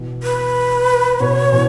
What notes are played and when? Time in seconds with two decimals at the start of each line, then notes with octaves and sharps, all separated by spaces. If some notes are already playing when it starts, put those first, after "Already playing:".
Already playing: B2 E3
0.23 B4
1.20 B2 C#5
1.52 B2 E3